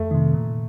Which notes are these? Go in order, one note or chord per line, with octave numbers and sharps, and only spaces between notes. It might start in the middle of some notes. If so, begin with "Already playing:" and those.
Already playing: F2 A3
C3 D#3
A#2